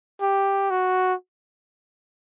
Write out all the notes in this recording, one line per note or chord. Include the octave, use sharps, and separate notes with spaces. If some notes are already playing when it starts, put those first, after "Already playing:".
G4
F#4